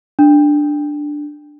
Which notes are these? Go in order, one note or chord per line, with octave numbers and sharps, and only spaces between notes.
D4